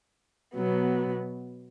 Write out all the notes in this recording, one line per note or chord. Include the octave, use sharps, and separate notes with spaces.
B2 F#3 B3